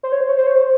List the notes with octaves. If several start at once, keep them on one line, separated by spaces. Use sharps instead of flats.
C5
C#5
C5
C#5
C5
C#5
C5